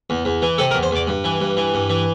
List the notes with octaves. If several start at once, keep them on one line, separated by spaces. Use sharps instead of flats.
E2
E2
E3
C3 A4
A#4
E2
C5
E2 D5
G2
E3
G2
E3
G2
E3